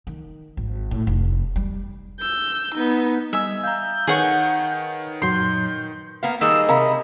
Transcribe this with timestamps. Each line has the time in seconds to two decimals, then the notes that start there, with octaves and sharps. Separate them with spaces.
0.07 D#3
0.57 G#1
0.91 A2
1.07 F1
1.56 G3
2.20 E6 G6
2.75 B3 D#4
3.33 G3 D#5 E5 G#5 E6
3.64 F5 A#5 G6
4.07 D#3 G#4 B4 C#5 F#5 C#6
5.22 F#2 A#2 F#3 C6 G6
6.23 A#3 B3 F5
6.41 D#3 G3 A#3 G#4 D#5 E6
6.69 C3 A#4 F5 A#5 B5